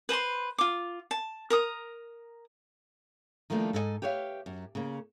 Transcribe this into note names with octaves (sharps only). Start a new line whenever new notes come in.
B4 C5 A#5 C6
F4 D6
A5
A#4 A#5 D#6
D#3 F3 G3 A3 A#3 D4
G#2 A4 C5 D#5 G#5
G4 B4 C#5 E5 F5
F#2
C#3 A#3